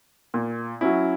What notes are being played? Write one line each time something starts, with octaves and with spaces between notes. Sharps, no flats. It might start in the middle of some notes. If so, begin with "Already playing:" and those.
A#2
F#3 C#4 E4